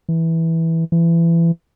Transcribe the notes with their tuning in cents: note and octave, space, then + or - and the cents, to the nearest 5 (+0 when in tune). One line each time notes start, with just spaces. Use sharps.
E3 -10
E3 +25